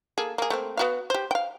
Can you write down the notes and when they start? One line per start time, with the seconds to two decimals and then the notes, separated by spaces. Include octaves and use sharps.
0.18 A#3 G#4 A4
0.38 A#3 G#4
0.50 A3 A#3 C4
0.77 B3 F#4 F5
1.10 G4 C5
1.31 F5 G5